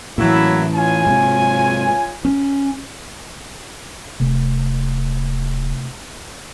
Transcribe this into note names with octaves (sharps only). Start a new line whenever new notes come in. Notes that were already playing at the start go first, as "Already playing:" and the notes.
A2 E3 F#3 A#3 E4
F4 C#5 G#5
G#2 C3
C#4
D1 C3 A3